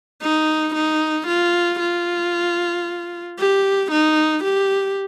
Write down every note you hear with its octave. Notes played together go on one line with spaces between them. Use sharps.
D#4
D#4
F4
F4
G4
D#4
G4